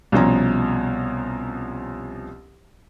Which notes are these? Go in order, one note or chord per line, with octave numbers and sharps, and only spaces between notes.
C2 B2 F3 C#4 A#5